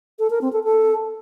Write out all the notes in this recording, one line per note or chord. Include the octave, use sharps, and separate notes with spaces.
A4
A#4
C4
A4
A4